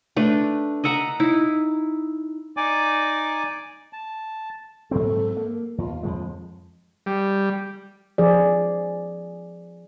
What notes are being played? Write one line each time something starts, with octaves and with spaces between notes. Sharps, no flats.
A3 D4 B4
D#5 E5 F#5 A#5
D#4 E4
D#4 D5 G#5 D6
A5
G#2 F#3 C4 A4
A#3
D#2 F4
F2 F3 G#3
G3
F3 G#4 D5